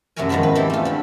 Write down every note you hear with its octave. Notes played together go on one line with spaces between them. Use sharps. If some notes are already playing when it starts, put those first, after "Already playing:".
F#2 C3 A3 F#4 A#4 G#5
E2 G#2 D#3 F3 A5 B5
B4
E3 C4 G4 A4
A3 F4
D3 B5